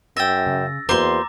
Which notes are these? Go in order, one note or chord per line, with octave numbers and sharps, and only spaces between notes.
F#2 E5 G5 E6 A6 A#6
C#3
E2 A#3 F#4 B4 C5 A#5 C6 D6